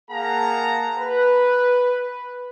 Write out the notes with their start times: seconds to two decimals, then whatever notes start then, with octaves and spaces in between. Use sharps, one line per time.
0.11 A#3 G#4 F5 F#5 A5 A#5
0.99 B4